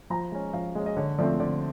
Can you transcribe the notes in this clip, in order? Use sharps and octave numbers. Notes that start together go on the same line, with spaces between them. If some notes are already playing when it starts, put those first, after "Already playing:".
F3 A#5
G#3 C#4
F3 F5
G#3 C#4 D#5
D#5
D3 C#5
F3 A3 C4 D5
D3 D5